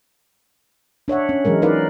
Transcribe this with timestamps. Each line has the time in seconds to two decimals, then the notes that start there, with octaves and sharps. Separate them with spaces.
1.08 D4 C#5 E5 F#5
1.29 C#4
1.45 E3 F#3 G#3 A#4
1.62 D#4 A#4 B4 D5 F5